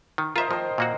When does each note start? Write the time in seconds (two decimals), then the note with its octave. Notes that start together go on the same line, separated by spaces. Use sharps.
0.18 D#3
0.36 F4 A#4 C5 D#5 E5
0.51 D#3 F3 C5
0.78 A#2 A#3 F#4